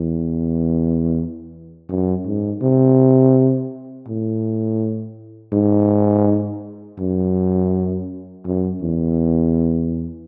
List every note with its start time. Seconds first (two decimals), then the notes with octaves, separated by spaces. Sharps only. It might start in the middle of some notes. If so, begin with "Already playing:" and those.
Already playing: E2
1.89 F#2
2.26 G#2
2.62 C3
4.08 A2
5.53 G#2
6.99 F#2
8.45 F#2
8.82 E2